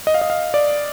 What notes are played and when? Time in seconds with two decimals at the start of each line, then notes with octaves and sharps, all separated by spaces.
0.07 D#5
0.14 F5
0.21 D#5
0.30 F5
0.54 D5